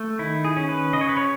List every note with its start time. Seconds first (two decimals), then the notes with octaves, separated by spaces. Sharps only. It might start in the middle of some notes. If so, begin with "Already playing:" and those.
Already playing: A3
0.19 D#3 E4
0.45 G#4
0.57 C#4
0.69 B4
0.93 C#3 D#5
1.01 C#5
1.09 B4
1.17 C#5